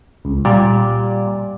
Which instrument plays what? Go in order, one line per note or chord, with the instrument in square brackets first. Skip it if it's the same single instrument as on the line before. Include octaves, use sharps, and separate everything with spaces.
[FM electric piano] C#2
[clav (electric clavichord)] A#2 [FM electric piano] G3 D5